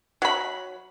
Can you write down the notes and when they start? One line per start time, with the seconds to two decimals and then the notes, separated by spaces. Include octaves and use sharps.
0.22 F#3 B5